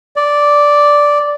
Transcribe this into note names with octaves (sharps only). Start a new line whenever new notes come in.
D5